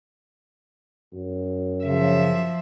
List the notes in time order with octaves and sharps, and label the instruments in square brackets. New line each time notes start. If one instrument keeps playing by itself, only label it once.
[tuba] F#2
[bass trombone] C#3 [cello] F3 E5